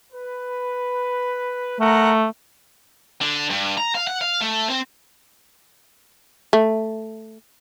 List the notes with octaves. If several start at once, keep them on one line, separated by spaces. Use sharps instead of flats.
B4
A3 A#4 F#5 A#5
D3
G2
A#5
F5
F#5
F5
A3
C4
A3